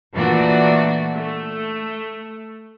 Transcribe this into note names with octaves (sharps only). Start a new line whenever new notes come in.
A#2 E3 A3 D4 F#4
A3